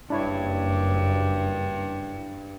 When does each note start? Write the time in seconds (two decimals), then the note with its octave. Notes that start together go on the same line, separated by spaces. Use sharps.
0.10 F#1 G2 D4 E4 C#5